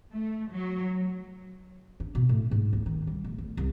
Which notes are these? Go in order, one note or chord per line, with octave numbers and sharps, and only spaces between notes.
A3
F#3
D4
B2
A2
G#2
D2
D#3
G3
D1
D2
C2